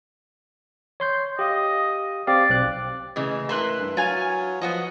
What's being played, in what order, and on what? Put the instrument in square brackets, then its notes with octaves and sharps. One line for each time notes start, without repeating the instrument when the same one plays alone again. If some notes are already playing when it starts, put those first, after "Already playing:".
[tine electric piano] C#5 C6 G6
[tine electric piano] G4 F5 [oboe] D#5
[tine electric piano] C4 G4 F5 [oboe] D5
[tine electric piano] B1 C4 F#6
[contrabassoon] A2 [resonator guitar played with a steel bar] C#3 E3 G#3
[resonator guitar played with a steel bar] E4 A#4 B4 [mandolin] E5 C6 F#6
[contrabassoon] G2
[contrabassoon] F#3 [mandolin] F4 G#5 F6
[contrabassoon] F3 [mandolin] B3 F#4 D#5